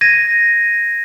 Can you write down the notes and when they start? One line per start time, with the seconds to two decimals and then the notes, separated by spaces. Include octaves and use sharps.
0.01 G#6 A#6 D#7